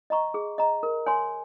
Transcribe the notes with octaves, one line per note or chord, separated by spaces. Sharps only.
D#5 A#5 C#6
G#4
D#5 A#5
A#4
C#5 G#5 C6